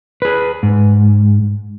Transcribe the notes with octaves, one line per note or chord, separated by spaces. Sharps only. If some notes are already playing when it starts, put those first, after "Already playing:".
G#4 B4
G#2